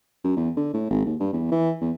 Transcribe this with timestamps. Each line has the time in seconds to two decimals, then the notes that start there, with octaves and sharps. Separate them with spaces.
0.24 F#2
0.37 E2
0.57 D3
0.74 A2
0.90 G#1
1.05 D#2
1.20 G2
1.33 E2
1.52 E3
1.81 E2